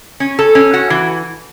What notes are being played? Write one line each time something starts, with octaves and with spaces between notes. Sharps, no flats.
C#4
A4
C#4
F#4
E3